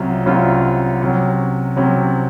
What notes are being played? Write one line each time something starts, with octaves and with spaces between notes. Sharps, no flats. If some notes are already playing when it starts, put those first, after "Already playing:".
Already playing: C2 C3 F#3 C#4 F4
C2 C3 F#3 C#4 F4
C3 F#3 C#4
C3 F#3 C#4